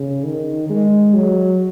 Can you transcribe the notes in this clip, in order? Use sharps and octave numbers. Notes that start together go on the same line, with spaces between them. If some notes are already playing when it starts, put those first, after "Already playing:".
Already playing: C#3
D#3
G#3
F#3